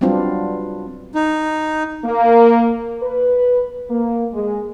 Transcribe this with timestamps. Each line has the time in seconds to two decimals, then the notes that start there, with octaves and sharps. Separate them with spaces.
0.01 F#3 G3 B3 C4 D4 F4
1.15 D#4
2.05 A#3
3.02 B4
3.90 A#3
4.33 G#3